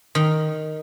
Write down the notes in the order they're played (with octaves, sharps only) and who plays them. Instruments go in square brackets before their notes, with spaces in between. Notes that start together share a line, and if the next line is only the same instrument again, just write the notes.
[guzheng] D#3